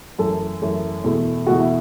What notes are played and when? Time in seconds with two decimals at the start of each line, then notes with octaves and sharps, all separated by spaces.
0.18 F#2 E3 A3 A4
0.62 F#2 E3 A3
1.04 E2 B2 A3
1.46 E2 B2 A3 F#4
1.60 E4